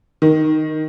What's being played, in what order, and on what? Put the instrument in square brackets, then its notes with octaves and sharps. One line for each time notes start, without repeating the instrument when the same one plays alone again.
[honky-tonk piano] D#3